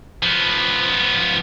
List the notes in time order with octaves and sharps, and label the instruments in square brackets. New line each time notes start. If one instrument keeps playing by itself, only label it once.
[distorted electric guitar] F3 B3